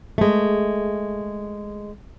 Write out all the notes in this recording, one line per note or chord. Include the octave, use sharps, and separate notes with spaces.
G#3 A3